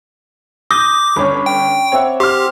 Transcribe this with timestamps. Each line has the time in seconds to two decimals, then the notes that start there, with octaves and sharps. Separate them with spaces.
0.71 D6 D#6 G6 A#6
1.16 G1 C#4 C#5 D5 B5
1.46 G5
1.92 C4 C#5 E5 F#5
2.20 G4 C6 F6